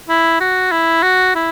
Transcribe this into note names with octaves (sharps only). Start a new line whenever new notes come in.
E4
F#4
E4
F#4
E4